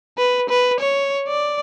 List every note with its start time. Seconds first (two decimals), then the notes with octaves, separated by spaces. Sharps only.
0.18 B4
0.49 B4
0.80 C#5
1.28 D5